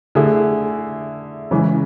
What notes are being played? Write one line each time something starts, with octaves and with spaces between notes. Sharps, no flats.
D3 A3 E4 G#4
C#3 E3 G#3 C#4